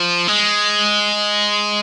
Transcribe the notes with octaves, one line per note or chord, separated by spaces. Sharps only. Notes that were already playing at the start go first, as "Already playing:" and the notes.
Already playing: F3
G#3